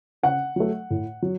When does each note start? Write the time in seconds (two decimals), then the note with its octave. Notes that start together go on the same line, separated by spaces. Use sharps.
0.23 C#3 F#5
0.56 F#3 A3
0.90 A2
1.22 F#3